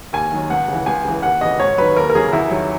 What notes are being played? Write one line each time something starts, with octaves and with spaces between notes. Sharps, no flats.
D#2 G#5
D#3 F#3
C#2 F#5
C#3
E3
C#2 G#5
C#3 E3
D#2 F#5
C#3 E3 D#5
G#2 C#5
D#3 F#3 B4
D#2 A#4
A#4
C#3 F#3 G#4
E2 E4
D#3 F#3